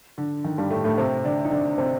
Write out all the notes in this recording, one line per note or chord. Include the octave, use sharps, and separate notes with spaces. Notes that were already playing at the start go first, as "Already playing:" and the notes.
D3
D#3
G2 G3
A2 A3
A2 A3
C3 C4
D3 D4
D#4
D3 D4
C3 C4